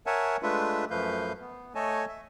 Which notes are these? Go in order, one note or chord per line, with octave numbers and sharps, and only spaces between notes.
A#4 C#5 E5 F#5 G#5 A5
G#3 A3 D4 F4 B4 E5
F#2 F3 A3 B4 F5 G6
B3
A3 A4 C#5 D#5 G#5 A5
E5